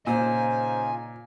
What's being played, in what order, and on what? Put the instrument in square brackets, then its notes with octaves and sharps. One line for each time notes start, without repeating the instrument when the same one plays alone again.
[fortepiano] A#2 [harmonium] C#3 D#4 F4 [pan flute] C5 [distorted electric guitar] G#5